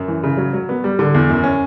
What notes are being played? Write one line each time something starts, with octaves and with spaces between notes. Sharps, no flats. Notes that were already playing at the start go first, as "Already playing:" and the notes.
Already playing: F#2
E3
C#3
F#3
F#3
B3
G3
D3
E2
F#2
C#4